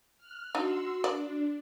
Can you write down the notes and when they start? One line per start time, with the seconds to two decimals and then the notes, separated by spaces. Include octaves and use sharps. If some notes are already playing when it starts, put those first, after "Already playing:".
0.18 F6 F#6
0.55 D4 D#4 F#4 C6 E6
1.04 D4 D5